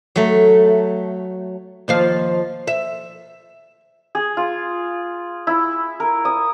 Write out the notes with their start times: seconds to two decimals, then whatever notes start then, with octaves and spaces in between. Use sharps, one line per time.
0.16 F#3 A3
1.88 D#2 F3 F5
2.67 E5
4.15 G#4
4.37 F4
5.47 E4
6.00 A#4
6.25 D#6